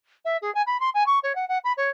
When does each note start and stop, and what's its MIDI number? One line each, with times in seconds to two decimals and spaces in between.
0.25 0.37 76
0.42 0.53 68
0.55 0.62 80
0.66 0.80 83
0.80 0.90 84
0.94 1.04 80
1.06 1.19 85
1.23 1.35 73
1.35 1.47 78
1.49 1.58 78
1.64 1.72 83
1.77 1.89 73